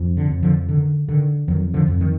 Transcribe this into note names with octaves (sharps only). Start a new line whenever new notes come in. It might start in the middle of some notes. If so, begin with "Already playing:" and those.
Already playing: F2
D3
F2
D3 F3
D3 D#3
D3 D#3
F2 D#3 F#3
D3 F3
F2
D#3